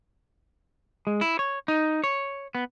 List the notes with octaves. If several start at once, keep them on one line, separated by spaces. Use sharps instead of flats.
G#3
E4
C#5
D#4
C#5
B3